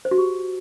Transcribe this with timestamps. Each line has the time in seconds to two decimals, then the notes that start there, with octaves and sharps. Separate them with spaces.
0.05 C5
0.11 F#4
0.18 G4